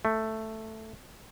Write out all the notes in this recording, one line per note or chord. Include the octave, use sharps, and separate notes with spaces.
A3